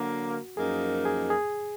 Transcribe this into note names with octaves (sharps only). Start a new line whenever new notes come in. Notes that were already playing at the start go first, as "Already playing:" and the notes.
Already playing: D3 F#3 A#3 F#4
F#2 F3 A#3 D#4 G#4
G#4
G#4